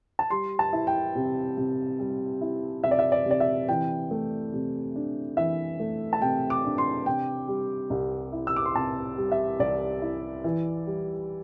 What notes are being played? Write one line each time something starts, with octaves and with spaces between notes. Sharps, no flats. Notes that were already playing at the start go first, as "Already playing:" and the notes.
A5
G3 C6
A5
E4
G5
C3
C3
G3
E4
C3 E5
D5
E5
D5
C3 D5
E5
E3 G5
A3
C3
D4
E3 E5
A3
A5
C3 G5
D6
D4
C6
C3 G5
G3
C2
E4
E6
D6
C6
C3 A5
G3
E5
C2 D5
E4
E3
G3